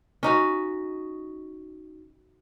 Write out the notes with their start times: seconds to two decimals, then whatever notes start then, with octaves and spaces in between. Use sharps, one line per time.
0.23 C#4 D#4 F#4